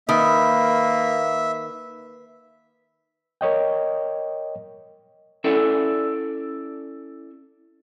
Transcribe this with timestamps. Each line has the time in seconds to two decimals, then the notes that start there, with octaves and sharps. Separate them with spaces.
0.09 D#3 A#3 B4 E5
3.41 A#4 C#5 D#5 G5
5.44 C#4 E4 A4 D5 E5